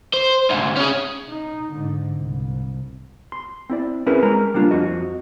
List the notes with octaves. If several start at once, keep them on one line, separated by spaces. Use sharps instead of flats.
C5
D2 G#2
C#4 G#4
D#4
G#2 D3
C2
C6
C4 E4 D5
C4 C#4 E4 G#4 A#4 B4
G#3 A#4 A#5
G3 A#3 D4 F4
F2 F#4 D#5